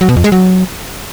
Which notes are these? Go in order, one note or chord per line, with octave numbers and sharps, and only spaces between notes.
F#3
B2
F2
G#3
F#3